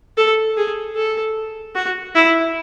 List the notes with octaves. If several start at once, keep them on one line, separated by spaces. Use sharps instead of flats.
A4
G#4
A4
F#4
E4